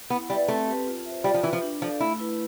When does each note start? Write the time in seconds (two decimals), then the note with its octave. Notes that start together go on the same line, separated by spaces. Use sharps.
0.10 B3 E4
0.30 G3 B4 E5
0.48 A3 C4
0.67 G4 B4
0.87 F4
1.06 C5 E5
1.24 G3 F4
1.34 F3
1.43 E3 B4 E5
1.53 F3
1.62 D4
1.82 F3 A4 D5 F5
2.00 A3 E4
2.20 E4 B4